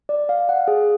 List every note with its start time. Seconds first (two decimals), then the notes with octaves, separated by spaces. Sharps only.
0.09 D5
0.29 F5
0.49 F#5
0.68 G#4